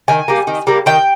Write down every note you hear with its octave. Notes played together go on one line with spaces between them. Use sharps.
D#3 G#5
G3 A#3
D#3
G3 A#3
D#3 G5